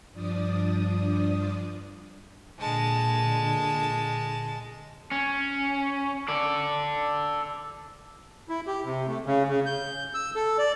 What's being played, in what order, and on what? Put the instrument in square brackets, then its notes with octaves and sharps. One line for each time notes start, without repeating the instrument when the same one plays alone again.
[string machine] G2 F3 D4 D5 D#6
[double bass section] A#2 D3 [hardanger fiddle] G#3 A5
[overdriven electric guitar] C#4
A4 D5
[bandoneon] E4
G4
C3
A3
C#3
C#3
G6
E6
A4
D5